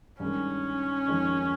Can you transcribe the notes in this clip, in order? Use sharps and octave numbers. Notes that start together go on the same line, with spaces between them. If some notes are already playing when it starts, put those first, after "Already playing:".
G2 D#3 G#3 C#4
F2 D#3 G#3 D#4 A#4